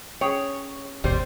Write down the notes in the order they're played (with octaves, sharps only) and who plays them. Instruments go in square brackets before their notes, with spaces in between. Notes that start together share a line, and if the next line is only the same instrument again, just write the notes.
[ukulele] C#4 G#4 G5 [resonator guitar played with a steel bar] C#5
[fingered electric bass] G#1 E2 B2 [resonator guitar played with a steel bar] G3 C5